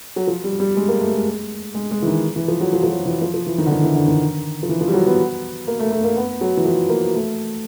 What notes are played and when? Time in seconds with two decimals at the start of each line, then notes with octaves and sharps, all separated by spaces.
0.16 F#3
0.27 F3
0.44 G3
0.60 G3
0.76 G#3
0.88 A#3
1.01 A3
1.13 G#3
1.74 G#3
1.91 G#3
2.02 E3
2.07 D#3
2.36 E3
2.48 F3
2.61 F#3
2.73 F3
2.83 F3
2.89 F#3
3.06 E3
3.22 F3
3.34 F3
3.47 E3
3.58 D#3
3.66 D3
3.71 D#3
3.83 E3
3.96 D3
4.08 D#3
4.63 F3
4.69 E3
4.81 F3
4.88 G3
4.94 F#3
5.06 B3
5.68 A#3
5.80 A3
5.92 A3
6.04 A#3
6.16 B3
6.41 F#3
6.57 E3
6.65 F3
6.89 A#3
7.15 A3